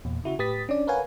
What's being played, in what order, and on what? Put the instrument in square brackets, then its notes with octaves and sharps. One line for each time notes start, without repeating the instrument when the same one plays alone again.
[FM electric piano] E2 A#2
C#3 E4 F#4
A2 G4 B4 D#6 A6 B6
C#4 D4 D5
A#4 B4 C#5 F5 F#5 G#5